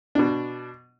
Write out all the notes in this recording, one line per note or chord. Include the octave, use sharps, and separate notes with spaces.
B2 D4